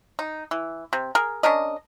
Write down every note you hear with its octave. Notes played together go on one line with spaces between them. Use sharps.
D#4
E3
C3
G#4 A#4
C#4 D4 A#4 D#5